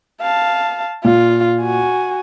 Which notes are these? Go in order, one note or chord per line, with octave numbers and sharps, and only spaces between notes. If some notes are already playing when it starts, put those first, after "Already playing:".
F5 A5
A#2 F4
F#4 G#5